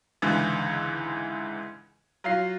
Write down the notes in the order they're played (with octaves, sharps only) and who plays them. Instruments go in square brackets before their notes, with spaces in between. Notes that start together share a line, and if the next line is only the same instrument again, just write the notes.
[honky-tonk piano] C#2 G#2 D3 E3
F#3 F4 C7